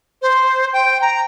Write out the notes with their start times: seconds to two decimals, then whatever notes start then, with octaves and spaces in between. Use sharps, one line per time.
0.22 C5
0.73 G5
1.02 A#5